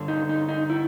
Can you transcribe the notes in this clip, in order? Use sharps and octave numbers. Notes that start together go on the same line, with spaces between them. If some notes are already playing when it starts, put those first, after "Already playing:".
Already playing: G2 D3
D#4
D#4
D#4
E4